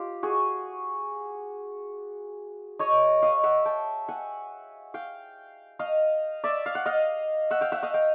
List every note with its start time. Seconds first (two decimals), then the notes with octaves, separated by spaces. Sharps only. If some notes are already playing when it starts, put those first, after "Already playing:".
Already playing: F4 G4
0.23 F#4 G#4
2.79 C#5 D#5
3.22 D#5 F5
3.44 E5 F#5
3.65 G5 A5
4.09 F#5 G#5
4.94 F5 G5
5.79 D#5 F5
6.44 D5 E5
6.66 F5
6.75 F#5
6.86 D#5 F5
7.51 E5 F#5
7.61 F5 G5
7.72 E5 F#5
7.83 D#5 F5
7.94 F5 G5